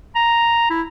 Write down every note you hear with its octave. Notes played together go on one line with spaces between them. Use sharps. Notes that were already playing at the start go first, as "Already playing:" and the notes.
A#5
E4